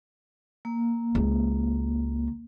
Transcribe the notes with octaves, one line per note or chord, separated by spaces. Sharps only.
A#3
C#2